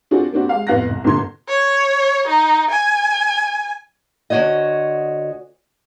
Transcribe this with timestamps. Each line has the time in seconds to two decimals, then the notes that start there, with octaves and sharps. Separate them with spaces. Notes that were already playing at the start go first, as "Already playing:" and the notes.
0.11 C4 D4 F4 F#4 G#4 A4
0.33 A#3 C4 D4 F#4 G4
0.49 G#3 F5
0.67 F2 A2 B3 F5 F#6 A#6
0.89 C2
1.04 G1 A#2 D3 A4 C6 G#6
1.48 C#5
2.27 D#4
2.70 G#5
4.30 D2 C3 F#4 C#5 D#5